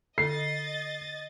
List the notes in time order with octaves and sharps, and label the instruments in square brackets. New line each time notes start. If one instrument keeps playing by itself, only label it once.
[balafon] D3 [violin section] D#5 A6 [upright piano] C7